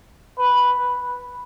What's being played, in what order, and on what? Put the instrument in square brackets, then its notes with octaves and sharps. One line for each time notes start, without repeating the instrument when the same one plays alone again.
[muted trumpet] B4